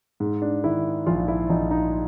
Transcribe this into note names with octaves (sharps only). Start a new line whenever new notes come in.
G#2
D4
D#3 E4
A#1 F4
E4
A#1 D#4
D#4